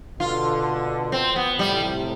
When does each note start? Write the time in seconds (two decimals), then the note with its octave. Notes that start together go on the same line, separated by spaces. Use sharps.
0.19 B2 D3 F4
1.12 C4
1.36 B3
1.59 A2 C3 G3